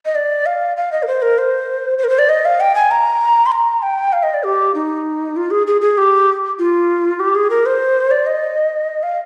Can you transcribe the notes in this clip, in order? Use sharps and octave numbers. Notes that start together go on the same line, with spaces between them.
D#5
D5
F5
F5
D#5
A#4
C5
A#4
C5
C5
A#4
C5
D5
D#5
F5
G5
G#5
A#5
C6
A#5
G5
F5
D#5
D5
G4
D#4
F4
G#4
G#4
G#4
G4
F4
G4
G#4
A#4
C5
D5
D#5
F5